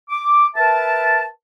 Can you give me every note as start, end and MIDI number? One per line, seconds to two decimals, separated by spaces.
0.09 0.46 86
0.55 1.24 70
0.55 1.24 71
0.55 1.24 76
0.55 1.24 81